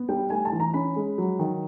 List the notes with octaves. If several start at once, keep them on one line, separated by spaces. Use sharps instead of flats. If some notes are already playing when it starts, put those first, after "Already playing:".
Already playing: B3
G3 G5
A3 G#5
A5
E3
A#5
C#4 B5
G#3
F#3
D#3